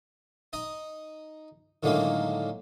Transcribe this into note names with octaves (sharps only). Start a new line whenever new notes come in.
D#4 D#5
A2 D3 D#3 F#3 G#3 A#3